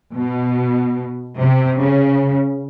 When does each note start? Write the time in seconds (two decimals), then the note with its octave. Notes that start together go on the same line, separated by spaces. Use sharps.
0.16 B2
1.37 C3
1.78 C#3